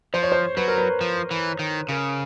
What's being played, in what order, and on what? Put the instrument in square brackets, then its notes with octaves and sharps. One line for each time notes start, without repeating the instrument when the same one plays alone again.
[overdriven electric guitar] F3 [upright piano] C5
[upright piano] C#5
C5
[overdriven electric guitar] F#3 [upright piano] B4
[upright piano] A#4
B4
[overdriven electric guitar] F3
E3
D#3
[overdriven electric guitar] C#3 [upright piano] A#4